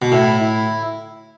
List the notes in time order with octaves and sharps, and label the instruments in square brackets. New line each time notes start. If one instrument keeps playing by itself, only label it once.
[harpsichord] B2
[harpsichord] A2 [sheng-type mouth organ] E4
[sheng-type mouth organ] E4